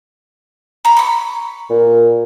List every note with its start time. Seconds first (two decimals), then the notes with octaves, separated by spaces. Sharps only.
0.85 A#5 B5
0.97 B5 C#6
1.70 A#2